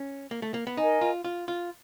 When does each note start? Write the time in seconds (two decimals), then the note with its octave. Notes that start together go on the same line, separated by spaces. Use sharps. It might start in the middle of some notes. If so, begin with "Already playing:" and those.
Already playing: C#4
0.31 A#3
0.42 A3
0.54 A#3
0.67 B3
0.77 D#4 A#4 D#5 G#5
1.01 F4
1.25 F4
1.48 F4